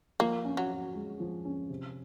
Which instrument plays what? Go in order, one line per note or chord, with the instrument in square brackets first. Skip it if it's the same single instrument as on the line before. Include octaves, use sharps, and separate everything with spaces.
[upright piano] F3 [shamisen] A#3
[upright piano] C#4
[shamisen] F#3
[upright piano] F#4
G#3
F3
C#4
C3